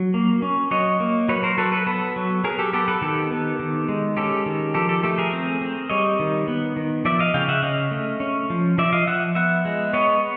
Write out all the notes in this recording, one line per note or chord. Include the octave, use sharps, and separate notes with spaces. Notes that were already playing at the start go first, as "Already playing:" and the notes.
Already playing: F#3
A#3
C#4
F#3 C#5 D#5
A#3
F#3 B4 C#5
A#4 C5
F#3 A4 B4
A4 B4
B3 A4 B4
F#3
F#3 G#4 A#4
G4 A4
B3 G4 A4
A4 B4
D#3 G4 A4
B3
D#3
G#3
C#4 G4 A4
D#3
F3 G4 A4
G4 A4
A3 G4 A4
G#4 A#4
C4
C4
G3 C#5 D#5
D#3
B3
D#3
F3 D5 E5
D#5 F5
C#3 F5 G5
E5 F#5
C#4 D#5 F5
A3
C#4
F3
F3 D5 E5
D#5 F5
F3 E5 F#5
B3 E5 F#5
G#3
B3 C#5 D#5